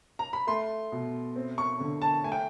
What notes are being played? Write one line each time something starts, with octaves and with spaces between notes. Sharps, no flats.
A#5
B5
A3 C6
B2
C4
C#6
D3
A5
A3 G#5
G5